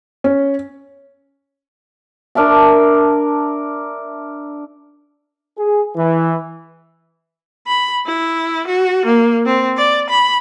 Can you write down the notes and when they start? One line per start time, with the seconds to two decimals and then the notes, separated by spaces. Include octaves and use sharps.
0.24 C#4
2.35 D4 A#4 E5 A5
5.58 G#4
5.96 E3
7.67 B5
8.06 E4
8.67 F#4
9.06 A#3
9.46 C4
9.77 D5
10.10 B5